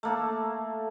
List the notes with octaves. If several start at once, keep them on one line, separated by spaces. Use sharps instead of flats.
A3 A#3 A4